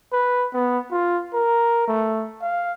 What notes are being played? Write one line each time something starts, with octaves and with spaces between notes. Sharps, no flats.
B4
B3
F4
A#4
A3
F5